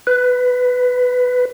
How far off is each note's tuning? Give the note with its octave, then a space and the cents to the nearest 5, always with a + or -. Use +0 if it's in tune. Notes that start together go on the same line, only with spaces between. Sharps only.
B4 +10